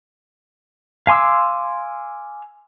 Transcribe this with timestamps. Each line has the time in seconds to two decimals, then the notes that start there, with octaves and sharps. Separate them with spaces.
1.07 F5 G#5 C6 D6 E6